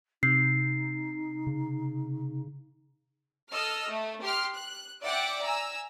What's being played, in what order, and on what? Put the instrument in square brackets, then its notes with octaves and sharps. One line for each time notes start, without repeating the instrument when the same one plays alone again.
[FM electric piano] C3 [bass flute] D#4 [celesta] C7
[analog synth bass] C#3
[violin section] A4 D#5 E6 F6
A3
G4 C6 F6
F#6
D5 E5 F#5 G5 D6
G#5 A#5 E6